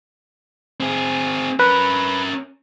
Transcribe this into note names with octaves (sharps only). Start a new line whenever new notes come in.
C4 G#4
C#4 A#4 B4